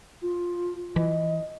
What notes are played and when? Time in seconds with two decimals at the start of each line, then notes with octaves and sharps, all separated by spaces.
0.22 F4
0.96 E3 D#5